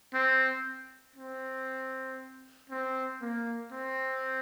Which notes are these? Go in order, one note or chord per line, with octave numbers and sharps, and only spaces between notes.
C4
C4
C4
A#3
C4